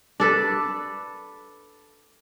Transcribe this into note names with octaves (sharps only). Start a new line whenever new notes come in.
D4 A4 B4